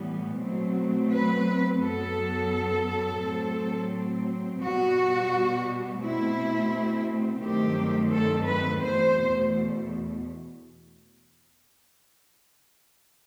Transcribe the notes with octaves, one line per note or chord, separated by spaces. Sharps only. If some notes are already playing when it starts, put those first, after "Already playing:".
Already playing: A2 E3 G3 B3
B2 F#3 A3 C4
B4
F#2 F#3 B3 A4
A2 F#3 C4
B2 G3 B3 F#4
B2 A3 C4 E4
G2 D#3 F#3 A3 C4 G4
A4
B4
E2 B2 A3 C5